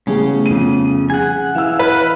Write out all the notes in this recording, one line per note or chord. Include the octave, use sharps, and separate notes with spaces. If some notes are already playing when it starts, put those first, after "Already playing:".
A1 C#3 G3 A3 B3 G#4
F2 D#7
G#4 F#5 G#5
E3 E5 F5 E6 F6
B4